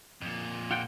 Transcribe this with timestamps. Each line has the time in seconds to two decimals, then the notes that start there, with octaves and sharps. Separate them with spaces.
0.21 F2 A#2
0.71 F4 F#5 G5